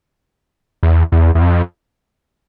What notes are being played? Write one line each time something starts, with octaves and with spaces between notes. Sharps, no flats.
E2
E2
E2
F2